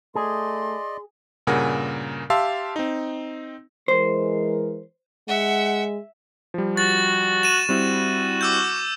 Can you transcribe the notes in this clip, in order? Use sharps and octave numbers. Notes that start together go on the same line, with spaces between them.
A3 G#4 D5 D#5 C6
G2 A#2 C#3 A#4 F#5 G#5
G4 E5 F5 A5 C6 E6
C4 D#4
E3 G#3 A#4 C5
G#3 E5 F#5
F3 G3
F#4 A6
D#7 E7
G3 C4 E4 F#4
D6 E6 G6